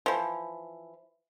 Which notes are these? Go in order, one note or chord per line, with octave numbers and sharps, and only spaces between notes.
E3 F3